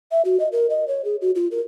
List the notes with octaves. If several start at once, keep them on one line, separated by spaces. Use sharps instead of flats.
E5
F#4
D#5
A#4
D#5
C#5
G#4
F#4
F4
A#4